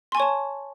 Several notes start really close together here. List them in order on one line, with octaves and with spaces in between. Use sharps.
C6 G#5 C#6 C#5 A5